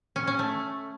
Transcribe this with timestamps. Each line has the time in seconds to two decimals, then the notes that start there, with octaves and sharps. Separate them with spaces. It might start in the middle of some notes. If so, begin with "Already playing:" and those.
0.16 C#4
0.27 C#4
0.39 A3